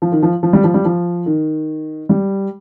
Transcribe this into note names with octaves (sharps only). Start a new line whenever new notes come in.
F3
D#3
F3
F3
G3
F3
G3
F3
D#3
G3